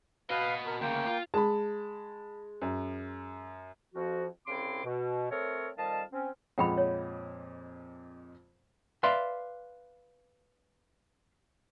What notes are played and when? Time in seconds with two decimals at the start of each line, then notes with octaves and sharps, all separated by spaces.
0.30 F#4 B4 D#5 F5
0.66 A#4
0.81 D2 C#3 A#3 G5
1.06 F4
1.34 G#3 A5 B5
2.62 F#2
3.94 F2 F3 F#4
4.47 C2 C#3 C4 E4 C6 D6
4.85 B2
5.30 A3 C4 A4 A#4 C#5
5.77 F2 D#3 G3 D#5 F5 A5
6.11 C4 C#4
6.58 F2 A#2 G#3 F#5 G5 B5
6.78 C#5
9.03 B4 D5 E5 F5 C6